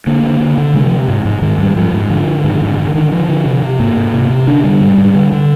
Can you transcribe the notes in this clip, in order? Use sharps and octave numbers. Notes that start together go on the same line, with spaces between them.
D3 A#3
D3
D3
D3
C3 G#3
F3
C3
G#2
G#2
G#2 D#3
G#2 G3
G#2 F3
G#2
D3 F3
D3
G#2 D#3
D3
G#2
D3
D3 D#3
D3 D#3
D3 F3
D3
C3
C3
G#2 A#3
G#2
C3
C3
D3 D4
D3 G3
G#2
G#2
D3
D3